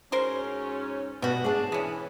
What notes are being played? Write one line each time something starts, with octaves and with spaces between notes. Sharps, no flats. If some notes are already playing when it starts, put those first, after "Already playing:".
G#2 F#3 C#4 A#4 C5 C6
F#2 B2 G3 B3 F#4
D4 G#4 D5 A5
E3 B3 C#4